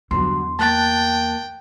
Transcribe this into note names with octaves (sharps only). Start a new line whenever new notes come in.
E2 G2 D3 F#3 C6
A#3 G5 A5 F#6 A6